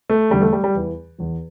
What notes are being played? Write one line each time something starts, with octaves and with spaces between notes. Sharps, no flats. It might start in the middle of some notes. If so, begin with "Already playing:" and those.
A3
E2 D3 G3
A3
G3
G3
E2 E3
E2 E3